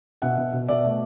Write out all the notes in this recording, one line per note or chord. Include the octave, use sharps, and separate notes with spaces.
B2 E5 F#5
B2
B2
B2 D5 E5
A3